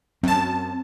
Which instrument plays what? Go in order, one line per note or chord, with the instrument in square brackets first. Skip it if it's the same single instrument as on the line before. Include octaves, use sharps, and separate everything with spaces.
[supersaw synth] F#2 A5 [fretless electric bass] C4